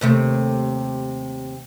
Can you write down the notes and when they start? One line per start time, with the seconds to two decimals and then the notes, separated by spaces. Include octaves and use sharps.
0.01 D#2 C3 A3